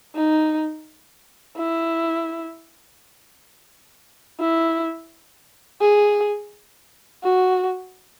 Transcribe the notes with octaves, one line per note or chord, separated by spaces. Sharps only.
D#4
E4
E4
G#4
F#4